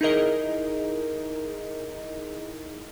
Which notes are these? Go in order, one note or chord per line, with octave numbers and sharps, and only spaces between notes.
D#4 E4 G#4 A#4 D#5